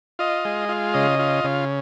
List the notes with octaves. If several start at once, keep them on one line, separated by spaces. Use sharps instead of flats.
F4 D#5
G#3
F4
C#3 D#5
F4
C#3